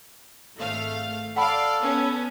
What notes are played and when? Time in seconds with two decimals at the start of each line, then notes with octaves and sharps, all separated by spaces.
0.57 G#1 A3 F5
1.36 A4 D5 F5 F#5 B5
1.82 B3 C#4